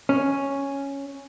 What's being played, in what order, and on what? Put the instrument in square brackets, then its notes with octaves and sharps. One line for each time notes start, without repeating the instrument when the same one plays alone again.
[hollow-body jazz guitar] C#4